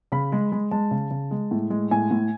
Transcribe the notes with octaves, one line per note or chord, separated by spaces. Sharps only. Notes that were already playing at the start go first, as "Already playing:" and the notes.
C#3 B5
G#3
G#3
G#3 A5
C#3
C#3
G#3
A2
G#3
A2 G#5
A2